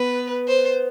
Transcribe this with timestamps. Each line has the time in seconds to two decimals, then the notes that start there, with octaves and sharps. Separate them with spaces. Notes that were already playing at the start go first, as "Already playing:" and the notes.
Already playing: B3 B4
0.48 C5